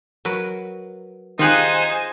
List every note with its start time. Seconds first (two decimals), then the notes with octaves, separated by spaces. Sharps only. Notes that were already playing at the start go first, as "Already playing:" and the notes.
0.25 F#3 A#4 B4
1.39 D#3 D#4 F4 G4 G#4 C5 G#5 F#6